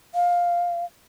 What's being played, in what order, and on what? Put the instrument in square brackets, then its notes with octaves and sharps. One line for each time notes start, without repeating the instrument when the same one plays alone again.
[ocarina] F5